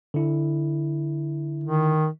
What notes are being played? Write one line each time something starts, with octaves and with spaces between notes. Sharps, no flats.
D3 E4
D#3